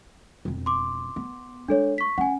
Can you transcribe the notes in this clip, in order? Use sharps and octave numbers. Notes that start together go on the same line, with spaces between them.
E1 F2
C6 D6
B3
G#3 D4 A4 C#5
C#6 B6
C#4 F#5 G#5